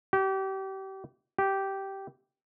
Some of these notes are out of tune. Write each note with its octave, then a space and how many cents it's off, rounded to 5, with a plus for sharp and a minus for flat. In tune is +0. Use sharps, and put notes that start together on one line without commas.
G4 -30
G4 -10